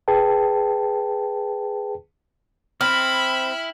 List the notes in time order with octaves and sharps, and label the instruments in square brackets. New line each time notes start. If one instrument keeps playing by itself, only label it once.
[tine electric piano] G#4 B4 G5 A5
[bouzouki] C4 [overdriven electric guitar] E4 [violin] B5 [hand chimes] F6